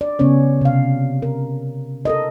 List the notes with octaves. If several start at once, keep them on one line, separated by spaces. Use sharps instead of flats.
D5
C#3 B3 C#4 C#5
C3 F5
A#4
A4 A#4 D#5